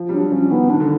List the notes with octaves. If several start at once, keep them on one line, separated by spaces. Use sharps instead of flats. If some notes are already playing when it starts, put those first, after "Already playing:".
Already playing: F3
G3
F#3 D4
F3 C#4
D#3 B3
D#3 D4
D3